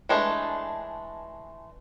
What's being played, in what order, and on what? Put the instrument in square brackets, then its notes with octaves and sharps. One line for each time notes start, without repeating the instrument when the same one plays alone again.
[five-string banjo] E3 G#3 A3 D4